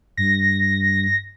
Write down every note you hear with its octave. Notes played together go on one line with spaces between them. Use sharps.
G2 A#6